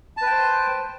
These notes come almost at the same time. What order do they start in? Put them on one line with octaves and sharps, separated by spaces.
A5 B4 G5 C5